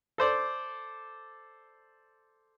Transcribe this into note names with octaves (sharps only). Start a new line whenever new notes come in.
A4 C5 D5